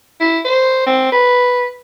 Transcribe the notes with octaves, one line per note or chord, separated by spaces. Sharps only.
E4
C5
C4
B4